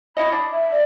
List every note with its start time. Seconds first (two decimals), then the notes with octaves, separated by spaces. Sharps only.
0.17 E4 F#4 D#5 B5
0.32 D4
0.51 E5
0.72 D5